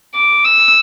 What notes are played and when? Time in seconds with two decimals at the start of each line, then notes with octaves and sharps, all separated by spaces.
0.14 D6
0.45 E6